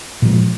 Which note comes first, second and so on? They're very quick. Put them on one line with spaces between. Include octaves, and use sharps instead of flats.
A#2 F3 G#3